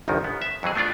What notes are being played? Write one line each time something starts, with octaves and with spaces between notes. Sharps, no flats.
G1 C2 F#2 D#3 F3
B3
E5
F2 E3 F#3 G#4
A3 B3 D4 F4 D5